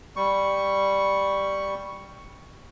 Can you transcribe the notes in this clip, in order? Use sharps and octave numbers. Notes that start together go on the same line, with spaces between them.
G3 C#6